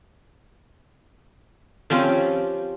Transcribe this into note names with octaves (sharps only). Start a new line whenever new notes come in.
F3 C4 C#4 F4 G4